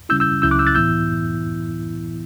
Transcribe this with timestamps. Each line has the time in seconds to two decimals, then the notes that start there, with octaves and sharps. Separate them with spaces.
0.09 C#3 G3 C#4 E4 E6 G6
0.20 E6 G6
0.42 C#2 C#3 F#3 C#4 E4 E6 G6
0.51 D6 F#6
0.59 E6 G6
0.67 F#6 A6
0.75 A2 E3 B3 E4 E6 G6